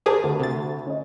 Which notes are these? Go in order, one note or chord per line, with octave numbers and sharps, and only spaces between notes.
G4 G#4 A#4 C5 A5 D6
D2
C3 A6
C#4 D#5